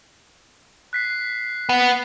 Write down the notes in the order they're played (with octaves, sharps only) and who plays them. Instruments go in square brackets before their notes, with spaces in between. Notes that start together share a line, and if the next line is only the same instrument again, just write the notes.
[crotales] F#6 B6 C7
[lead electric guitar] B3